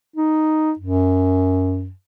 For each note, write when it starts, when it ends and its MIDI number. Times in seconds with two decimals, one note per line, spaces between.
0.16 0.73 63
0.79 1.91 42